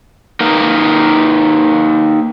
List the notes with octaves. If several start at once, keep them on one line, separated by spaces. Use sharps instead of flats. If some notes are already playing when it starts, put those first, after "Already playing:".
A#3 D#4 A#4 B4